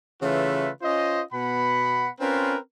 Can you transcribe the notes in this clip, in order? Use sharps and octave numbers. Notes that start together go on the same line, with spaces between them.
C#3 E3 A3 F4 B4 E5
C#4 F4 C5 D#5
B2 B3 F#5 B5
C4 C#4 F4 A#4 B4